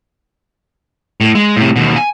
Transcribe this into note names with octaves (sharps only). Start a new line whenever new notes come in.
A2
G#3
A2 C3
D#2 B2
G#5